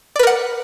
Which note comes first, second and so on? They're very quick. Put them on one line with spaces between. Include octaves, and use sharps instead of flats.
D5 B4 A#4 F#5